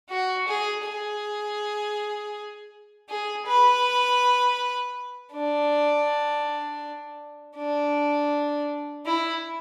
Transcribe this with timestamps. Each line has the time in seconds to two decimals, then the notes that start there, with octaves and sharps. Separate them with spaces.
0.10 F#4
0.48 G#4
0.85 G#4
3.09 G#4
3.46 B4
5.33 D4
7.57 D4
9.06 E4